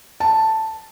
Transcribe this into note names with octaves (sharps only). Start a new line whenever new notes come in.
A5